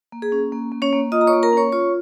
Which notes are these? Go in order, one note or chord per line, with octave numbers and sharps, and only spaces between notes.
A#3
G#4
C#4
A#3
A#3
C#4 C#5
A#3
F4 D#5 D#6
A#5
C#5 C#6
A#3
A#4 A#5
C#4 C#5 C#6
F4 C#5 C#6